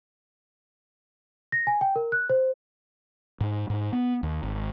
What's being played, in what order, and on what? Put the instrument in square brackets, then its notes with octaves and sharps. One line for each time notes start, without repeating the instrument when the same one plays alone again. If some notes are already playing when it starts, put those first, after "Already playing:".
[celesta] A#6
G#5
G5
A#4
F#6
C5
[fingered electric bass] G#2
G#2
B3
D#2
G#1